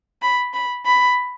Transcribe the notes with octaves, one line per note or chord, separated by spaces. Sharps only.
B5
B5
B5